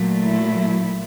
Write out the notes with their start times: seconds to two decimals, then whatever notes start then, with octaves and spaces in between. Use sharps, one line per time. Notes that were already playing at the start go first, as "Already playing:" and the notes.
Already playing: A#2 F#3 A3
0.23 E4